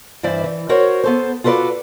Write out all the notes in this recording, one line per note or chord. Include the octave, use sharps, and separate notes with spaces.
G2 E3 C5 D5 E5
E3
F#4 A#4 C5 C#5 F#5
B3 A4 C5
F4 F#4 A4 B4 D5